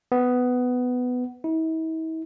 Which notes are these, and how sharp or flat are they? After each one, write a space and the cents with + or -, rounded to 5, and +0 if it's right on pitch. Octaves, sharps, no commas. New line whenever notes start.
B3 +10
E4 -45